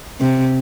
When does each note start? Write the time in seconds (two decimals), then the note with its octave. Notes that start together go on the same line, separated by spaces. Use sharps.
0.20 C3